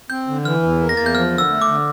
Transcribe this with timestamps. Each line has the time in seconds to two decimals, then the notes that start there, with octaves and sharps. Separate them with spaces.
0.10 C4 G6
0.28 D3
0.45 E3 F6
0.63 E2
0.80 A#3
0.89 A#6
0.97 E2 A6
1.06 G6
1.15 F3 F6
1.32 D3
1.38 E6
1.50 A3
1.62 D6
1.67 D3